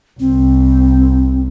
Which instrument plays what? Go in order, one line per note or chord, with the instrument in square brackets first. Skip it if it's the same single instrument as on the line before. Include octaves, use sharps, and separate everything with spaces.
[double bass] C2 [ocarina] C4